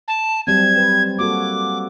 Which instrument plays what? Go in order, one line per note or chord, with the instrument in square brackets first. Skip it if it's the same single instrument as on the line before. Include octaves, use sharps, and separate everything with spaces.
[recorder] A5
[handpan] F#3 G3 C4 [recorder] G#6
[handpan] B4
[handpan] A#3 F#4 A4 [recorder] D6